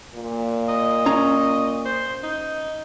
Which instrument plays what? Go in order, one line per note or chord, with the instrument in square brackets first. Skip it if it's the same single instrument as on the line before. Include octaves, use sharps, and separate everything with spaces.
[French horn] A#2
[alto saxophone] D#5
[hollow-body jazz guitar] C#4 A#5
[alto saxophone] C5
D#4